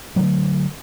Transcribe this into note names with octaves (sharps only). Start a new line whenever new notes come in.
D3 D#3 F#3 A3